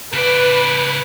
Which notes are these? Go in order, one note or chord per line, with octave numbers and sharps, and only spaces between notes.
C#3 B4 D5